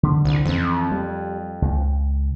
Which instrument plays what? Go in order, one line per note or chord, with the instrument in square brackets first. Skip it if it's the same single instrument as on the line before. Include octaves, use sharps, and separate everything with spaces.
[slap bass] D3
[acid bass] C2
[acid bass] F2 [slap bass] E3 C4
[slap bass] G3
C#2